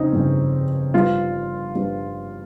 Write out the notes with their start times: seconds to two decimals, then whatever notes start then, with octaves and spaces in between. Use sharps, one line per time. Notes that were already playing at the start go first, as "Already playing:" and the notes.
Already playing: F2 C#3 C4 C#4 D#4
0.12 G1 F2 C#3
0.94 G1 G2 F3 F4
1.75 G1 G2 F3